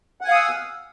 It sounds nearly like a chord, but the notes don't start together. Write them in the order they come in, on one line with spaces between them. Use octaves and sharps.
F#5 G#5 F5 D#6 E6